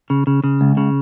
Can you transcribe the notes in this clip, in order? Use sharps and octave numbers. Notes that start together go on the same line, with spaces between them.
C#3
C#3
C#3
C#2
C#3